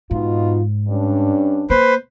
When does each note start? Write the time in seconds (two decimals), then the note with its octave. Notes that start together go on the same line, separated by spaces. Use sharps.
0.11 G#2 B2 D#4 F4
0.88 G2 C#4 D4
1.70 A#3 B4 C5